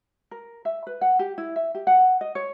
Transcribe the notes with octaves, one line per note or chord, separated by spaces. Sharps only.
A#4
E5
B4
F#5
G4
E4
E5
G4
F#5
D#5
C#5